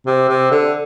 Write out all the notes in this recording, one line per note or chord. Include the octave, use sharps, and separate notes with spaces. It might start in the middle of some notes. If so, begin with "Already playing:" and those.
C3
C3
D3